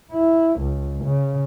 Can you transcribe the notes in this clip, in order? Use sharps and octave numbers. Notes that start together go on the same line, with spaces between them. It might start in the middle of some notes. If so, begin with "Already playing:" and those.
E4
C#2
C#3